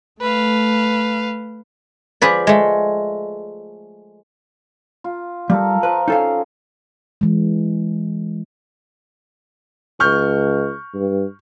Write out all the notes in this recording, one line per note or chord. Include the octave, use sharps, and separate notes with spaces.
A3 B4 F5
F3 G#4 B4 D5
G#3 A3
F4
G3 A4 A#4 F5
F3 A#4 B4
C#4 D#4 A4 F5
E3 G#3
C#2 C#6 F6 G6
G2